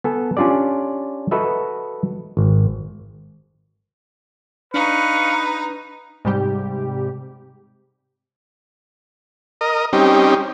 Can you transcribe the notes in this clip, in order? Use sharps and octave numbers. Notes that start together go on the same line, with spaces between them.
B3 A4 G#5
C#4 D4 F4 G4 D5
F#4 A4 B4 D#5 E5
G#1
D4 D#4 B4 F5 C#6
G#2 C3 G3 G4
A#4 D#5
G3 C4 C#4 D#4 G4